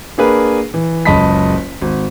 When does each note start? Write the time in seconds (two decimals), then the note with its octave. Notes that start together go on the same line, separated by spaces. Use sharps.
0.18 A#3 D4 G#4 A#4 B4
0.74 E3
1.05 F#1 C#2 D#5 A5 B5 B6
1.81 G#1